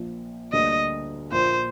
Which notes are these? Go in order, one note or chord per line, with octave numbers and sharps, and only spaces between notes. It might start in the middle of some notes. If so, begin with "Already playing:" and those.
Already playing: A#1 A#2 F3 A#3
D2 D3 G3 A#3 D#5
A#1 A#2 F3 A#3 C5